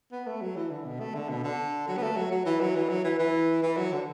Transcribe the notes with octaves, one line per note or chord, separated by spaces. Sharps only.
B3
A3
F#3
E3
D3
B2
A3
D3
B2
D3
F#3
B3
A3
F#3
F#3
E3
F#3
E3
F#3
E3
E3
E3
F#3
D3